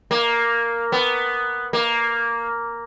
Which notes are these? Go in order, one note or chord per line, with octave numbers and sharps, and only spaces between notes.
A#3
B3
A#3